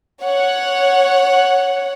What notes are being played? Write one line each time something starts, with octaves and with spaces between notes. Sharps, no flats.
C#5 F#5